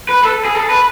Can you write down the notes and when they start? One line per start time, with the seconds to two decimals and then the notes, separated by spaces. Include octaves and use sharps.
0.09 B4
0.24 A4
0.45 G#4
0.55 A4
0.70 B4